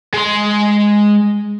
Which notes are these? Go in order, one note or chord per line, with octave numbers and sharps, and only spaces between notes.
G#3 C6